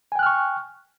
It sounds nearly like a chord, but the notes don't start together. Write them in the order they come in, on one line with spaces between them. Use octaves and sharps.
G#5 G5 F#6 F6 C#6